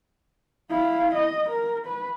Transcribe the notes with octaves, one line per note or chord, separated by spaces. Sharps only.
E4 F5
D#5
A#4
B4